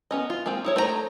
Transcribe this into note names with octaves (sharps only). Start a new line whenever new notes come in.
B3 C#4 D#5
F4
G#3 A#3 C4 F4
D#4 E4 C#5
A3 C5 D5 A#5